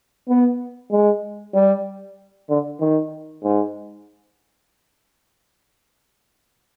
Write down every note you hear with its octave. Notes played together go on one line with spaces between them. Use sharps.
B3
G#3
G3
D3
D#3
G#2